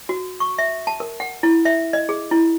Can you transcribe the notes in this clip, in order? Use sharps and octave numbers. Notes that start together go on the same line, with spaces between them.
F#4
C#6
E5
A5
A#4
F#5
E4
E5
D#5
G#4
E4